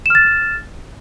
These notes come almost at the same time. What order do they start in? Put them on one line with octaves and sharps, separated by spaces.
E7 F6 A6